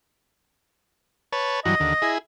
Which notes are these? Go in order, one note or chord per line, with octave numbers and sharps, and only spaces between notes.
B4 C#5 A5
G2 E3 F#3 D#5
D#2 D3
E4 G#4